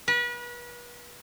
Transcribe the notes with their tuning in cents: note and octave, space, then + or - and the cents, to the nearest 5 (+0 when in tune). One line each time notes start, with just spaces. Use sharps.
B4 -35